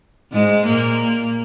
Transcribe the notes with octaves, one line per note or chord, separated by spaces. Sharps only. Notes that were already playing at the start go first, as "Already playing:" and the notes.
G#2 G#3
A#2 A#3